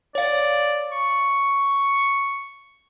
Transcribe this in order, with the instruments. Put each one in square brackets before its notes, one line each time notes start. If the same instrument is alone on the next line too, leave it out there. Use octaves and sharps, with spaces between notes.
[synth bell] C#5 F5 [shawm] D5
[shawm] C#6